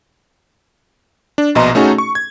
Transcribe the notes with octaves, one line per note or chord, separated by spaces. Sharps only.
D4
A#1 B2 D#5 A#5 C6
A3 C#4 D#4 F#4 G#4 A4
C#6
G#6